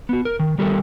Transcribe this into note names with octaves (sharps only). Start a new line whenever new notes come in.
B3 F#4
A#4
D#3
D#3 G3 G4 A4 A#4